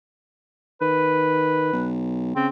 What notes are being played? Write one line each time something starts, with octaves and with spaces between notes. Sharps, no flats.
D#3 B4
B1
C#3 C4